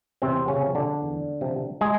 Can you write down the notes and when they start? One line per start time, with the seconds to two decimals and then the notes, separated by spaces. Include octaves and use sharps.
0.22 E2 C3 C4
0.48 C#3 C#4
0.62 C3 F3
0.75 D3 D4
1.02 E2
1.41 C3 F3
1.81 G#3 G#4